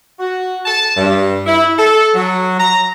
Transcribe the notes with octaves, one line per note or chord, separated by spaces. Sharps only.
F#4
A5
G2
E4
A4
F#3
A#5